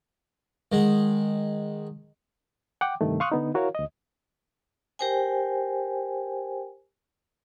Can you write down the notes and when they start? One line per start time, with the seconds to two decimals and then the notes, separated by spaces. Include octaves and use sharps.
0.72 D#3 G#3 F#5
2.81 F#5 G5 D6
3.01 G2 C3 D#3 A3
3.20 F5 C6 C#6 D#6 F6 F#6
3.32 D3 B3 D#4
3.54 E4 F#4 A#4 C#5 F5
3.75 D2 D#5
4.99 G4 A#4 C5 G5 G#5